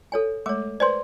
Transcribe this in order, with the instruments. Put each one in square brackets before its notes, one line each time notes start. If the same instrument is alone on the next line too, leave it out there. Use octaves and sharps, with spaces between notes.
[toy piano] A4 C#5 G#5
[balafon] G#3 A3 [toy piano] C#5 D6
[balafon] B4 C5 [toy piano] D5 G#5 C6